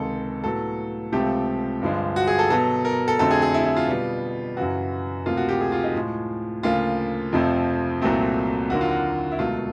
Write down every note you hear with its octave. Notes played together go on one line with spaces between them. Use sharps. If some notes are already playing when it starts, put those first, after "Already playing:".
Already playing: C#2 C3 D#3 G#3 A4
A2 F#3 B3 A4
C#2 C3 F3 A3 C4 G4
G2 D3 F3 G#3
F#4
G#4
A4
B2 F#3 B3 A4
A#4
A4
F2 D3 F#3 A3 C4 A4
G#4
G#4
E4
E4
F4
B2 G3 B3
F#2 C#3 E3 F#4
D2 C3 F3 A#3 F4
F#4
G4
G#4
F4
D#4
A2 F3 G#3
D2 C#3 F3 A#3 F4
F2 C3 F3 A3 C4
C2 A#2 F#3 A3 C4
D#2 D3 F#3 A#3 F#4
F4
F#4
E4
C#2 B2 F#3 A3 F4